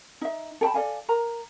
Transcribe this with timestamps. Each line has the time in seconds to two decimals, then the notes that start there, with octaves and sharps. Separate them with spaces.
0.21 D#4 E5
0.61 A4 G5 A5 B5
0.74 A4 D5 F5 G#5
1.09 A#4 A#5